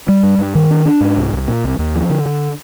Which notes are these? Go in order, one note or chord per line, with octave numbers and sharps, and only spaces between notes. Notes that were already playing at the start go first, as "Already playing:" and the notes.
G3
G2
G2
D#3
D4
D4
G#2
C2
C2
A#2
C2
D#2
F3
D3
D3